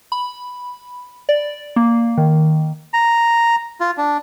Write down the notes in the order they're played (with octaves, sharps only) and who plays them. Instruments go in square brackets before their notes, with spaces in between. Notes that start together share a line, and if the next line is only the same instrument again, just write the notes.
[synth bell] B5
D5
A#3
D#3
[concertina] A#5
F4
D4